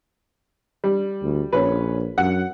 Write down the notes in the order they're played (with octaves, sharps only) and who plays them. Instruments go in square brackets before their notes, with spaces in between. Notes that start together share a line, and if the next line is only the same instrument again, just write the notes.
[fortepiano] G3
[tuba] D2
[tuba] A#1 [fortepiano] C#4 B4
[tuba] F#2 [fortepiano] F#5